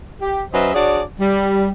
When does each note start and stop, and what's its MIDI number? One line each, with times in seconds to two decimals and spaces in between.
0.20 0.43 67
0.53 0.72 54
0.53 0.72 61
0.53 0.72 71
0.53 0.72 72
0.53 0.72 75
0.53 0.72 76
0.73 1.01 62
0.73 1.01 66
0.73 1.01 68
0.73 1.01 73
0.73 1.01 74
1.19 1.70 55